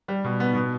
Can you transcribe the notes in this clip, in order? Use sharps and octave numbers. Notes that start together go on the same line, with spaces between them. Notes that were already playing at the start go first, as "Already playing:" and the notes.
G3
B2
B3
B2